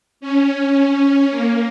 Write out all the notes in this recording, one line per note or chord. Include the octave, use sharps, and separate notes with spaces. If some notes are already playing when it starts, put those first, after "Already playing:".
C#4
A#3